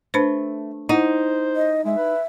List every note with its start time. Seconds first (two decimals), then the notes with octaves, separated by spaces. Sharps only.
0.14 A3 D4 B4 C5
0.89 D#4 E4 C5 F#5
1.56 D#5
1.85 G#3 E5
1.97 B4